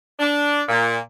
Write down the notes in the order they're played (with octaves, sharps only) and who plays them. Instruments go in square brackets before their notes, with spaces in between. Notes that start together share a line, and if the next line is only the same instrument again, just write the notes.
[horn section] D4
A#2